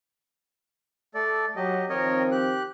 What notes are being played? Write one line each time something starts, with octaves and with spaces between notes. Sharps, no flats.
A3 A4 D5
F#3 G4 D#5
D#3 F3 C4 A#4 C#5 D#5
G4 F#6